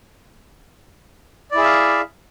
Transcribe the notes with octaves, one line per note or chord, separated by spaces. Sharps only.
E4 G#4 D5 E5 F5